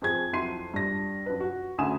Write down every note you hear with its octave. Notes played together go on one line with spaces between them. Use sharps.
F2 C4 G#4 G#6
F2 F#3 E4 C6 C7 D#7
G2 A#6
F#2 B4
F#4
D2 C#3 G#5 D#6 E7